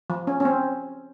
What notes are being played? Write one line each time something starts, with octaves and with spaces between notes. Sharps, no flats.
F3
C#4
C#4
C4